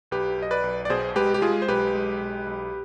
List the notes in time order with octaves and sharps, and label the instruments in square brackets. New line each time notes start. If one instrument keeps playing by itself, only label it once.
[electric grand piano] B1 G4 B4
B1
D#5
B4 D5
B1
D5
B2 G#4 C5
G#3 G4 B4
G4
G#3 F4 G#4
C5
B1 G4 B4
G#3
B1
B1